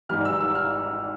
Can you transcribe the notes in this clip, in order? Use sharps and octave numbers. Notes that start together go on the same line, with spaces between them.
G#1 G#2 E3 G3 F6
E6
E6
F6